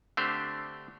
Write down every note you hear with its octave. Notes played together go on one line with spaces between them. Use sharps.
D3 A3 C4 D4 G4 C5